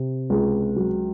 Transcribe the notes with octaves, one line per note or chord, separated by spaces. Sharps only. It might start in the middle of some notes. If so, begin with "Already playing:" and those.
Already playing: C3
C#2
F#3